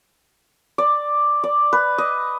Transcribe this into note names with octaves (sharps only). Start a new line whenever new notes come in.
D5
D5
B4
D#5